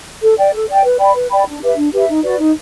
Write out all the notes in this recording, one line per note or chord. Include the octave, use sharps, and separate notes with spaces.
A4
D5 G5
A4
D5 G5
B4
D5 G5 B5
B4
D5 G5 B5
D4
G4 B4 E5
D4
G4 B4 E5
D#4
F#4 B4 D5
D#4